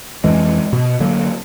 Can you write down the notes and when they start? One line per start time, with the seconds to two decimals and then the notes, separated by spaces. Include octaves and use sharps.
0.24 F2 E3 G#3
0.73 B2
1.00 D3 F#3 A#3